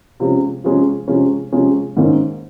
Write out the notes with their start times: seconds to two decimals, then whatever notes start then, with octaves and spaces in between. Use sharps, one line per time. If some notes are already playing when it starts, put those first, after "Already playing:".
0.20 C3 F3 G#3 C#4
0.64 C3 F3 G#3 C#4
1.08 C3 F3 G#3 C#4
1.52 C3 F3 G#3 C#4
1.97 G#2 D#3 A#3 C#4